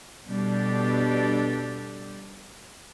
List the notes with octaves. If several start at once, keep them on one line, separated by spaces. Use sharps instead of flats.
B2 G3 D4 G4 A4